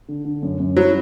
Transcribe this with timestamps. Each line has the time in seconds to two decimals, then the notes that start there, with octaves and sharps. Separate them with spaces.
0.08 D3
0.25 D3
0.43 F#2
0.60 F#2
0.76 F#3 E4